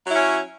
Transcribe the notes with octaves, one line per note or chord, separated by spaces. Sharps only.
F#3 C#4 E4